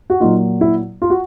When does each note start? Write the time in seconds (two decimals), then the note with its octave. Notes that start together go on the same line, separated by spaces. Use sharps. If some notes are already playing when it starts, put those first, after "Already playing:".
0.10 F#4
0.20 A#2 F#3 D#4 F4
0.61 E4
1.02 F4
1.10 F#4